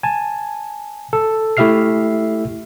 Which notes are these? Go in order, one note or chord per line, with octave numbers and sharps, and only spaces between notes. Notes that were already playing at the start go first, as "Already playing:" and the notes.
G#5 A5
A4
A3 E4 G4 E5 F6 C7